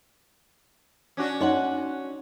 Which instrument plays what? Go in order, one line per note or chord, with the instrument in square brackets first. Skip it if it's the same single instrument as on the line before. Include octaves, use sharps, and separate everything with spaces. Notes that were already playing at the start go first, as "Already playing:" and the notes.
[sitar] C#4 D4 F#4
[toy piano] D#4 D#5 C6 [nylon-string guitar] C#5 F#5